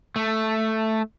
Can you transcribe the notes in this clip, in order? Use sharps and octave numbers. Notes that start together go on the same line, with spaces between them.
A3